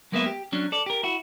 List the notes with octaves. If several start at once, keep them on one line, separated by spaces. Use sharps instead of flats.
F#3 G#3 A#3 B3 B4 E5
G4
F#3 C#4 D4
A4 D5
G4 A#4
E4 F#4